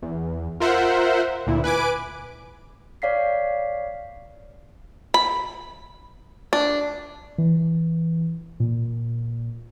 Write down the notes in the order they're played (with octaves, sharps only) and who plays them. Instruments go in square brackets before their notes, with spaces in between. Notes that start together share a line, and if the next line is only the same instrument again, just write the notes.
[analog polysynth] E2
F4 A#4 C5 E5 F#5
D2 A#2 E4
B4 G#5 D6 D7
[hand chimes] C#5 D5 F5 B6 C7
[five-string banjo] B5
D4
[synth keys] E3
A#2